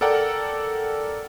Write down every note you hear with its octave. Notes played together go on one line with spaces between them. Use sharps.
A4 A#4 D5 F#5 G5